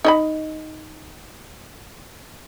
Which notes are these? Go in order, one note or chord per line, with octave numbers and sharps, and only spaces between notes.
D#4 D#5 B5